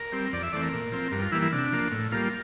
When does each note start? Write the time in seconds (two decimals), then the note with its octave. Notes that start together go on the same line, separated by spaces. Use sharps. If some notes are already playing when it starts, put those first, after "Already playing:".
Already playing: A#4
0.12 G3 C4
0.33 F2 D5
0.43 E5
0.53 E3 A3 C4 D5
0.62 A#4
0.73 A#2
0.92 F3 C4
1.12 G2 A#4
1.22 F4
1.32 E3 G3 A#3 E4
1.42 E4
1.53 C3 D4
1.72 F3 A#3
1.92 A2
2.12 G3 A#3 F4